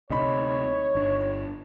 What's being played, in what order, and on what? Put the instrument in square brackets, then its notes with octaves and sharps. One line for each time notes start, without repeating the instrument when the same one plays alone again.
[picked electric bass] D2 C3 [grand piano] D#4 B5 [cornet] C#5
[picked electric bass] G1 D4